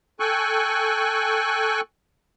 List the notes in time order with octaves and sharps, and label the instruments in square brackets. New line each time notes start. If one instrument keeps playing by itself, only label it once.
[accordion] A4 G5 G#5 C#6 F#6